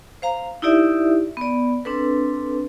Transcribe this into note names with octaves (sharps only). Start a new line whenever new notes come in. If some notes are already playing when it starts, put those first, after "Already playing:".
C5 F5 A#5
D#4 E4 G4 D5 E5
B3 D5
C4 D4 A4 B4